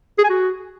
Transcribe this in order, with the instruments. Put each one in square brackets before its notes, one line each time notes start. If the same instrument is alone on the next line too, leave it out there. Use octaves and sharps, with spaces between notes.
[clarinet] G#4
G#5
F#4